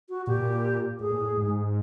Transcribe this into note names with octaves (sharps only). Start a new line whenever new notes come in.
F#4
A#2 G4
A2 G#4
A#2
A2
G#2